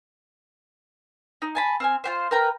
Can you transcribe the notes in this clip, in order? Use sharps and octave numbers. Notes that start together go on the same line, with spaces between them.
D#4
G#5 A5 B5
C4 F5 G#5
F4 G4 C5
A#4 B4 G5 A#5